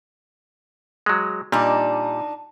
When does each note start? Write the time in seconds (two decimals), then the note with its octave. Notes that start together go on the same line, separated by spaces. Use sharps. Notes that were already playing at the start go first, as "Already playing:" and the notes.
1.06 F#3 G#3
1.52 A#2 G3 D4 D#4